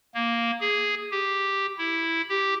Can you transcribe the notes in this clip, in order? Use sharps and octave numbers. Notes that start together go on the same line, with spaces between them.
A#3
G#4
G4
E4
G4